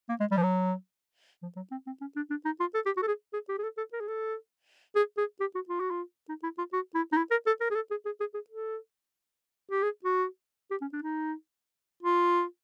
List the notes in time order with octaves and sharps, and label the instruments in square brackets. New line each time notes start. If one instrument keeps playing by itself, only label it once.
[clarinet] A#3
G#3
G3
F3
F#3
F3
F#3
C4
C4
C#4
D4
D4
D#4
F4
A4
G4
F#4
A4
G#4
G#4
G4
G#4
A4
A4
A#4
G#4
A4
G#4
G#4
G4
F#4
F4
F#4
F4
D#4
E4
F4
F#4
E4
D#4
E4
A#4
A4
A#4
G#4
A4
G#4
G#4
G#4
G#4
A4
G4
G#4
F#4
G4
C#4
D4
D#4
F4